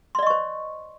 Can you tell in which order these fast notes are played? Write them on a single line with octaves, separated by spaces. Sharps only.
C6 D5 D#5 C#6 C5